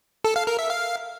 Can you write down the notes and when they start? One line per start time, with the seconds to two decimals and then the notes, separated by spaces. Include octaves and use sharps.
0.24 A4
0.36 F5
0.47 A#4
0.59 E5
0.70 F5